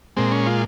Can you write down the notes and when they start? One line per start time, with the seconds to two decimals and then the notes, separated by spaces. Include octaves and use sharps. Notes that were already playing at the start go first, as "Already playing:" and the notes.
0.17 A#2 G#3 C4
0.32 C#4
0.46 F4